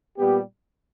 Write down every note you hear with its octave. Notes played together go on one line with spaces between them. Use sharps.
A#2 G3 B3 G4